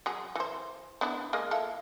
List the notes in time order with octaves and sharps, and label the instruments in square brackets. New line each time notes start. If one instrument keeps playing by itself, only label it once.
[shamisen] F#3 G#4
E3 C5
B3 D4 E4
G#3 A#3 D#5
E4 F4 A4